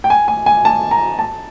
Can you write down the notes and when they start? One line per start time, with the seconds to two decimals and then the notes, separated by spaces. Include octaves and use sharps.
0.04 G5
0.10 G#5
0.28 G#5
0.46 G#5
0.65 A5
0.91 A#5
1.19 A5